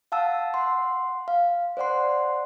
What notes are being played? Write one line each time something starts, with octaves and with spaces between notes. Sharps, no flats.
F5 F#5 A5 E6
F#5 C6
F5
C5 D5 F#5 C6